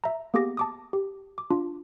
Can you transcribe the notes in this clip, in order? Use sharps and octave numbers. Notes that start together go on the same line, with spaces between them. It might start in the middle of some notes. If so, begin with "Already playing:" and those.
E5 A#5
A#3 B3 G4 G#4 D6 A#6
A5 D6 D#6
G4
D6
D4 F4